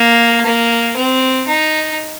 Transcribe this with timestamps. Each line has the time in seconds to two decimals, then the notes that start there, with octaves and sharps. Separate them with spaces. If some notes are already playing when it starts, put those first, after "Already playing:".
Already playing: A#3
0.46 A#3
0.96 C4
1.47 D#4